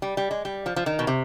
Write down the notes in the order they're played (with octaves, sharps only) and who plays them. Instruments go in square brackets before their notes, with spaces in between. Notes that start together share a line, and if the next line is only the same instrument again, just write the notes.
[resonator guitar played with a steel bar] G3
G3
G#3
G3
F3
F3
D#3
B2
C3